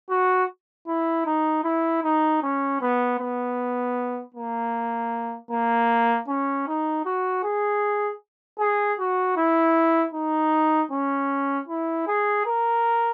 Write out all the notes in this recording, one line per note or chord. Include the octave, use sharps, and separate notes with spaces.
F#4
E4
D#4
E4
D#4
C#4
B3
B3
A#3
A#3
C#4
D#4
F#4
G#4
G#4
F#4
E4
D#4
C#4
E4
G#4
A#4